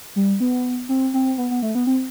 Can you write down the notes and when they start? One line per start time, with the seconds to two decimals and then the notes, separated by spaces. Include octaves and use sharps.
0.16 G3
0.40 B3
0.89 C4
1.14 C4
1.38 B3
1.51 B3
1.62 A3
1.75 B3
1.87 C4